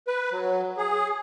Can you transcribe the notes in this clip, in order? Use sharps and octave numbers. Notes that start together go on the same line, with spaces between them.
B4
F#3
G#4